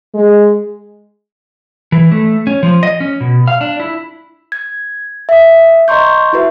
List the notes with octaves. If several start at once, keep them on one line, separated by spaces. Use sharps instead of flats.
G#3
E3
A3
C#4
F3
D#5
C#4
B2
F5
D4
E4
G#6
E5 D#6
D#5 A#5 C6 C#6 G6
E4 F#4 B4 E5